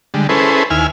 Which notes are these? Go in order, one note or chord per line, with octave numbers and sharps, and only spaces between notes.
D3 G3 G#3
C#4 E4 G#4 A4 B4 C5
D#2 E4 G#5 F6